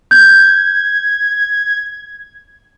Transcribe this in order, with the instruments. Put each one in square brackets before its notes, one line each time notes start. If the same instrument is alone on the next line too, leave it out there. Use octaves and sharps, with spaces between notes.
[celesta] G6 [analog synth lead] G#6